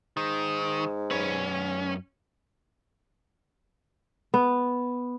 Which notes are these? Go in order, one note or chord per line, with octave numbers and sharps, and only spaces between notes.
G#2 D#3
F#2 C#4 B4
B3